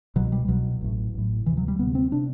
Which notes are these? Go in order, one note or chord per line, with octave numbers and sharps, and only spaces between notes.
C2 B2 F#3
G3
C2 B2 F#3
A1 A2
A1 A2
D2 C3 E3
F#3
G3
D2 C3 B3
C4
C3 D4